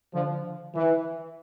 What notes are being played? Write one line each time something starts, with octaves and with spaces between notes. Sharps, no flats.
D3 F3
E3